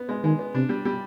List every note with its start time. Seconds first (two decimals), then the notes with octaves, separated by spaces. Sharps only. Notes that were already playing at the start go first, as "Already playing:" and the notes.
Already playing: B3
0.09 G#3
0.24 D#3 G#3
0.39 B3
0.54 C3 D4
0.69 G3
0.85 G3